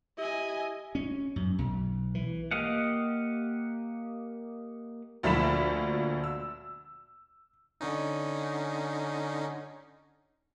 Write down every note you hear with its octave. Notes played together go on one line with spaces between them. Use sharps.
E4 G4 D#5 G#5
C#4
F#2
B1
E3
A#3 G4 D#5 F5 F#5
D2 A#2 F3 B5 B6 E7
E6
D3 C#4 D#4